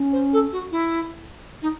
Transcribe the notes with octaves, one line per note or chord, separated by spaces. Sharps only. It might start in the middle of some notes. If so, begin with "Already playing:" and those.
Already playing: C#4
C5
A4
F#4
E4
D#4